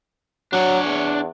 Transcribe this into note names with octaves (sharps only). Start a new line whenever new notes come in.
F#3 D4 C#5
E2